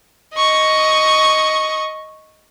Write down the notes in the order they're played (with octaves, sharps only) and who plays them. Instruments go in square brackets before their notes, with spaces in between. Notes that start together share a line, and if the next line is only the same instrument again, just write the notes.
[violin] D#5 C#6